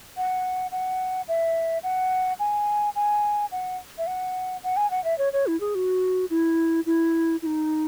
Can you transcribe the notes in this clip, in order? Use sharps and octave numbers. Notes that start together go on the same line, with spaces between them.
F#5
F#5
E5
F#5
G#5
G#5
F#5
E5
F#5
F#5
G#5
F#5
E5
C#5
C#5
E4
G#4
F#4
E4
E4
E4
D#4